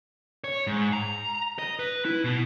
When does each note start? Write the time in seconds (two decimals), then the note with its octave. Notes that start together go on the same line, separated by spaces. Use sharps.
0.44 C#5
0.67 G#2
0.93 A#5
1.59 D#5
1.79 B4
2.05 E4
2.24 B2